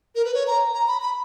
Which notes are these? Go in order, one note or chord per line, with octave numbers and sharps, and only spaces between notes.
A#4
B4
C#5
A#5
A#5
B5
B5